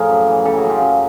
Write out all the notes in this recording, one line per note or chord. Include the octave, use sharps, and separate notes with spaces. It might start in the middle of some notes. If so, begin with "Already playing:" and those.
Already playing: A2 F3 G#4 A#4
F#2
E3
C#3 G4 A4
F#4 G#4
F#2
F4 G4
F#2